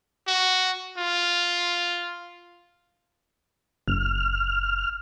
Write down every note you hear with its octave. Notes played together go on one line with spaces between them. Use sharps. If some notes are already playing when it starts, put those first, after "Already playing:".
F#4
F4
F#1 F6